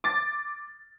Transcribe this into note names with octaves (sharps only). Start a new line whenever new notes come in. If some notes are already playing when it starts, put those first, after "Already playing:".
D6 A6